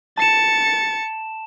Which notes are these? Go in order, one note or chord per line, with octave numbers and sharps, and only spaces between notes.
A5 A6 C#7 E7